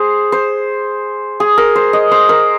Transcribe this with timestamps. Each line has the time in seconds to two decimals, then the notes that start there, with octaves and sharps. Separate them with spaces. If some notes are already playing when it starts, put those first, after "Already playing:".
Already playing: G#4 C5
0.32 C5
1.40 G#4
1.58 A#4
1.75 C5
1.93 D#5
2.11 C5
2.29 A#4